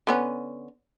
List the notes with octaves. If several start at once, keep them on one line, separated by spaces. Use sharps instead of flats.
D3 B3 C#4